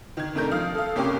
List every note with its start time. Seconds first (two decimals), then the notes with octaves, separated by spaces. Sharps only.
0.17 D#3 G#6
0.35 F2 C3 A3 D4 A#4 G6
0.51 F3 F5 D#6 F6
0.75 A4 F5
0.95 C2 A#3 C#4 G4 C#6 D6